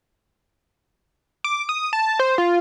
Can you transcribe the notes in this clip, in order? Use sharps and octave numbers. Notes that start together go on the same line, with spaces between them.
D6
D#6
A5
C5
F4